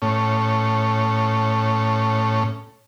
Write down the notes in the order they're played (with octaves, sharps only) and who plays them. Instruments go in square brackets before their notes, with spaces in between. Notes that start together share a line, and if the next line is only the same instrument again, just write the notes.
[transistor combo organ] A2 C#4